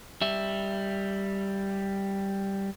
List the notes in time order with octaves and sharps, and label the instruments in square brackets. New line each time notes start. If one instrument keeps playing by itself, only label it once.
[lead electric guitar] G3 E5